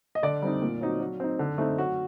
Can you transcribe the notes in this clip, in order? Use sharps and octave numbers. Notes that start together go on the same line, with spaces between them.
D#5
D3 D5
G3 C4 D#4
A#2
F#3 C4 D#4
F#3
C4 D#4
D3
A3 C4 D#4
F#3 F#4